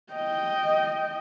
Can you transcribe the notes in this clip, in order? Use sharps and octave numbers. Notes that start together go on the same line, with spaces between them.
D#5 G5